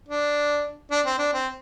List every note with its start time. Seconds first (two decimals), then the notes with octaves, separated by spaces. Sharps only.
0.08 D4
0.91 D4
1.05 C4
1.19 D4
1.33 C4